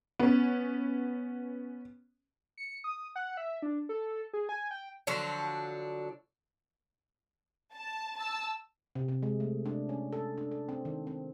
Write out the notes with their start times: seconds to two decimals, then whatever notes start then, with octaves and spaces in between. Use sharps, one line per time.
0.20 B3 C#4
2.58 C#7
2.84 D#6
3.16 F#5
3.37 E5
3.62 D4
3.89 A4
4.33 G#4
4.49 G#5
4.71 G5
5.07 D3 F3 F#3 D4
7.74 A5
8.18 A5 E6
8.95 C3
9.08 C3
9.23 G#3
9.40 A3
9.66 D4
9.89 C#4
10.13 A4
10.38 D4
10.51 A4
10.69 C4
10.85 D#3
11.07 C4